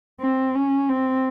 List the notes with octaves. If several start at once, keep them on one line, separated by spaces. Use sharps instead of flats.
C4
C#4
C4